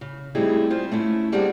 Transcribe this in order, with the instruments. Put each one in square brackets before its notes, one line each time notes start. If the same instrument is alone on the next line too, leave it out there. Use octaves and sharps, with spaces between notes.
[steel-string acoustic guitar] C#3
G3 A3 C4 D#4 E4 G#4
F4 C5
A3 C#4 E4
G3 A#3 C4 D4 G#4 F#5